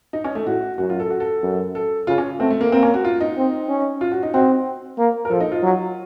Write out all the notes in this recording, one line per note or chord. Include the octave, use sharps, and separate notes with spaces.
D#4
C#4
A3
A2 F#4
F#2 F#4
F4
A4
F#4
A4
F#2
A4
C#3 F4
C#4
A3 C4
A3
A#3
A#3 C4
C#4
F#4
F4
D#4
C4
C#4
F4
F#4
D#4
C4 F#4
A#3
A#4
F3 A4
D#4
F4
F#3